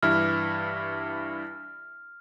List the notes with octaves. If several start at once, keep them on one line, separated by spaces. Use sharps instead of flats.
G2 E3 E4 F6